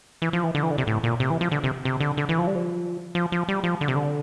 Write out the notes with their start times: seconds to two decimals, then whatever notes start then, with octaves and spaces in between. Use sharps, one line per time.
0.22 E3
0.33 F3
0.43 E3
0.55 D3
0.63 E3
0.71 D3
0.78 C3
0.87 A2
1.04 A#2
1.20 C3
1.30 E3
1.41 F3
1.52 D3
1.64 C3
1.85 C3
2.00 D3
2.17 D3
2.29 E3
2.39 F3
2.47 G3
2.55 F3
3.15 F3
3.32 F3
3.49 G3
3.64 F3
3.81 D3
3.88 C3
3.96 D3